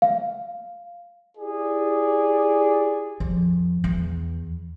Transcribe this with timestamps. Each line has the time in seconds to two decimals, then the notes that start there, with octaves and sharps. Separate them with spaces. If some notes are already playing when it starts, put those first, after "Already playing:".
0.02 F5
1.38 E4 G4 G#4 D5
3.20 F2
3.84 E2